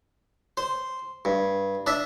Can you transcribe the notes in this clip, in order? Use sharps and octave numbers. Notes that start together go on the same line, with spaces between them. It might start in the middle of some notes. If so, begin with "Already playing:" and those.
C5
G2
D4 E5